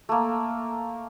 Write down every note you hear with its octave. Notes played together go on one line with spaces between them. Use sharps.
A3 A#3